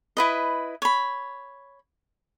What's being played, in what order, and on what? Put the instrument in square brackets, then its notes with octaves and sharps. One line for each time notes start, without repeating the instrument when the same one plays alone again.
[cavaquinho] E4 B4 D#5
C#5 B5